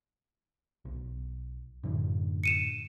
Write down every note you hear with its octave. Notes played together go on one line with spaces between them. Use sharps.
B1
F#2 A2 D3
C#7 D#7 E7